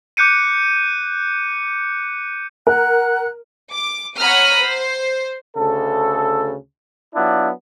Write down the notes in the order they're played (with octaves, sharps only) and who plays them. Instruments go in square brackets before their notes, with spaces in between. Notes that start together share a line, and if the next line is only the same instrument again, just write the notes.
[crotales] D6 F#6 G6 C#7 D#7
[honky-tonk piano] A#4 [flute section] F#5 F#6
[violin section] D6
C#5 F#5 A#5 B5 D#6 F6
C5
[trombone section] D2 C#3 A4
F#3 B3 D4 E4 F4